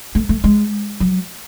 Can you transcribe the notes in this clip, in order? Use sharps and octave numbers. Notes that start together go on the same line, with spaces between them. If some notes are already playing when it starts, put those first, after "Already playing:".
A3
A3
G#3
F#3